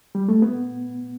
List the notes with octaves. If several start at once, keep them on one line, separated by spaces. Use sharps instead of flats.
G3
A3
B3